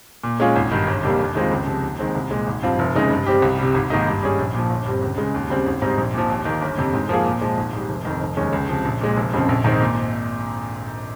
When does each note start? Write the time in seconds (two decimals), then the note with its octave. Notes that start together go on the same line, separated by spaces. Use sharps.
0.24 A#2
0.40 G#3 C#4 F4 G#4
0.56 G#1
0.71 G2 D#3
0.88 G1
1.03 F2 C3 G3 A#3
1.19 D#2
1.35 D#3 G#3 C4 F4
1.51 C#2
1.67 C3 F3
1.83 D#2
1.99 D#3 G#3 C4
2.15 C2
2.31 A#2 G#3
2.47 G#1
2.63 G2 F3 C4 F4
2.79 F1
2.95 D#2 C#3 G#3 D#4
3.10 G2
3.26 G3 C4 G4
3.42 C2
3.58 C3 G3
3.74 G#1
3.90 G#2 D#3 A#3 D#4
4.06 G2
4.23 G3 C#4 G#4
4.39 A#1
4.54 A#2 F3
4.70 G1
4.86 G2 G3 C4
5.02 C#2
5.18 C#3 G#3
5.34 D#2
5.50 C#3 G3 C4
5.66 G#1
5.82 G#2 G3 C4 D#4
5.98 A#1
6.14 A#2 F3
6.30 D#2
6.45 D#3 A#3
6.62 G1
6.77 F2 C3
6.93 G#2
7.09 F3 A#3 F4 G#4
7.26 A#2
7.41 F3 G#3
7.57 G#1
7.73 G#2 G3
7.89 F1
8.05 F2 D#3
8.21 F1
8.37 D#2 D#3 G#3 C#4
8.53 C#2
8.69 C3 F3
8.85 A#1
9.01 A#2 G#3
9.17 F1
9.33 F2 C#3 F3 C4
9.49 A#1
9.64 G#2 D#3 G#3 C4
9.81 A#2